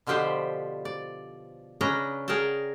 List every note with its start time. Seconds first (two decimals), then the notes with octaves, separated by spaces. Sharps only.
0.07 B2 D3 F3 G4 B4 C5
0.85 D5
1.81 C#3 C#4 D4 B4 D#5 A#5
2.28 G#4 A#4 F#5 G5 A5